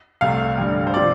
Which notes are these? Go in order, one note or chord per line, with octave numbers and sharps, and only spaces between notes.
C2 C3 A3 F5
A1 G2 D3 G3
C5
C3 F3 D5